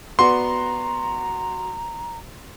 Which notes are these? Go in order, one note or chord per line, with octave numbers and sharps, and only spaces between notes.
B3 F#4 D5 A#5 C6